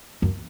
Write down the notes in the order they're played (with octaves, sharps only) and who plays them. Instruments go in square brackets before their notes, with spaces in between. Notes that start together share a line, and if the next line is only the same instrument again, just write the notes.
[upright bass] F#2